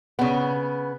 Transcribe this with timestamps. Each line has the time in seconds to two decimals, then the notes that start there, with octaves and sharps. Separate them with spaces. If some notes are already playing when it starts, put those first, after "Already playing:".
0.19 C#3 B3